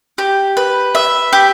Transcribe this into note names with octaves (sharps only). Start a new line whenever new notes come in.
G4
B4
E5
G4